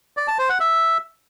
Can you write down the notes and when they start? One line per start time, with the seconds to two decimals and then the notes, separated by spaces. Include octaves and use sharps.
0.17 D5
0.28 A5
0.38 C5
0.49 F#5
0.60 E5